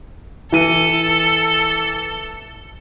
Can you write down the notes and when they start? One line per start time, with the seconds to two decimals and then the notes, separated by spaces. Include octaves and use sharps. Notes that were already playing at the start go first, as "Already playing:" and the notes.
0.52 E3 A4 D#7